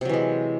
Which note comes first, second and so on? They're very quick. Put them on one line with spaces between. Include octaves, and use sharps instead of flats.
C3 F#3 E3 G#3